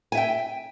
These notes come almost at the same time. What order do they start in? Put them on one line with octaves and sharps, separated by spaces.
G#5 E5 G5